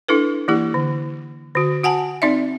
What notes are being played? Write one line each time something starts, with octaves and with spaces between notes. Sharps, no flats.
D4 E4 A4 B4
E3 A#3 E4 G4
D3
D3 F#4
F#4 F#5 G#5 A5
C4 D#4 D5 E5